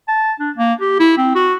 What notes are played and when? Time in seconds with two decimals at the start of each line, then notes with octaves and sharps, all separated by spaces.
0.08 A5
0.40 D4
0.58 A#3
0.81 G4
1.00 E4
1.17 C4
1.35 F#4